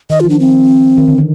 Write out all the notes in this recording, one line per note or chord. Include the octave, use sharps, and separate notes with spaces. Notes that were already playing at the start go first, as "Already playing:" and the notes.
D#3 D#5
F4
F3
D4
C4
D#3
D3
D#3